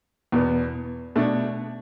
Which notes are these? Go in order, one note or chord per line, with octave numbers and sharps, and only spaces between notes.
E2 B2 B3
B2 A3 D4